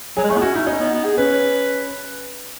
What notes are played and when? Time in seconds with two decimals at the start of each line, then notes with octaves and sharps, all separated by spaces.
0.17 F#3 G#4
0.24 G#3
0.30 A3 G#4
0.36 B3 E4
0.42 C#4 F#4
0.55 D#4 E4
0.67 C#4 D#4
0.79 B3
0.93 B3
1.05 G#4
1.17 C#4 B4